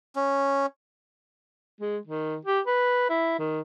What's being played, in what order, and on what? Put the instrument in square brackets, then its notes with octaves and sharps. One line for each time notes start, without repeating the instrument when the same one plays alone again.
[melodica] C#4
[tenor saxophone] G#3
D#3
G4
B4
E4
D#3